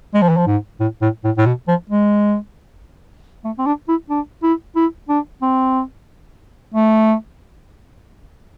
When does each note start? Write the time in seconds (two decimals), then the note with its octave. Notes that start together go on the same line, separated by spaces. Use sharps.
0.14 G#3
0.22 F3
0.29 E3
0.37 F3
0.46 G#2
0.80 A2
1.02 A2
1.24 A2
1.37 A2
1.46 B2
1.68 F3
1.90 G#3
3.44 A3
3.58 C4
3.66 D4
3.88 E4
4.10 D4
4.43 E4
4.76 E4
5.09 D4
5.42 C4
6.74 A3